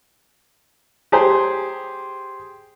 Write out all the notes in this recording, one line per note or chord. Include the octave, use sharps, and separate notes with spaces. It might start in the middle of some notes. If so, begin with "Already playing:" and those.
G4 G#4 C5